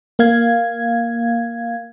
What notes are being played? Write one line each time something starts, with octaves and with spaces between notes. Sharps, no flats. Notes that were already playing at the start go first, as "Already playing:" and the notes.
A#3 F5 G#6